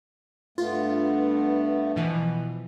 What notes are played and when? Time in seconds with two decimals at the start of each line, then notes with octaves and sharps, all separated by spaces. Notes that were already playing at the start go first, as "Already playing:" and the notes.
0.58 G2 A3 B3 F4
1.96 B2 E3 F3